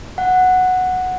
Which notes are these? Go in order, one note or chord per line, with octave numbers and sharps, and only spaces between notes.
F#5